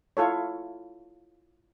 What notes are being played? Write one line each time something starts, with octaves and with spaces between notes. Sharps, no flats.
E4 F4 A4 C#5